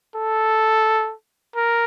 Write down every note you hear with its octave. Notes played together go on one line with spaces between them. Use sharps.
A4
A#4